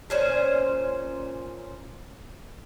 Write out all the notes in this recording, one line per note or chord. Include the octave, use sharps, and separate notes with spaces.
A#2 C#4 C5